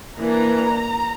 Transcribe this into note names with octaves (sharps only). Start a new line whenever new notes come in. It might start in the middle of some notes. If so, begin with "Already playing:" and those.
E3 A#3 D4 A#5